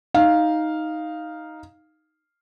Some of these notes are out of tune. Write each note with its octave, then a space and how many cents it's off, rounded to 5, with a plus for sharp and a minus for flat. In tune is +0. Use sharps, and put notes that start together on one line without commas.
D#4 +5 F5 +0